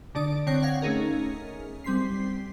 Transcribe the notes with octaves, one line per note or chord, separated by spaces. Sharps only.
D3 D4 D5 D#6 D7
D3 C4 C#5 G5 F#6 A#6
C#5 F5 F#5 G#6 A#6
A3 C#4 D#4 G#4 A#4
G3 C4 C6 B6 C7